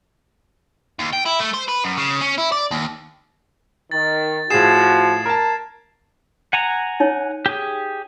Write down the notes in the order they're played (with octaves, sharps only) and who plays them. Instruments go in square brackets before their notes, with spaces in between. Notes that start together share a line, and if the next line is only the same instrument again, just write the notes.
[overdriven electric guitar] D#2
G5
E4
A3
C5
B4
F#2
C#3
C#4
E4
D5
D#2
[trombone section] D#3 [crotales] A6
[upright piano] A2 G#4 [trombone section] F3 F#4 [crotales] G#6 C7 E7
[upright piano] A#4 A5
[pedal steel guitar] F#5 G#5 A#5
[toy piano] D#4 C#5
[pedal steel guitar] G4 G#4